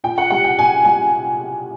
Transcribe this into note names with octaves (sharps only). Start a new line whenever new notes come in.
A#2 G5
F#5
G3 F#5
G5
A#2 G#5
G3 G#5